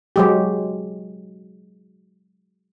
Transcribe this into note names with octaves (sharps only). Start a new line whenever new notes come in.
F#3 G#3 G4